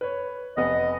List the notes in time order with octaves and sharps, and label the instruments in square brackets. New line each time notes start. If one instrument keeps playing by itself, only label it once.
[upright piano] B4 C#5
[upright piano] F1 B3 B4 [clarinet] D#5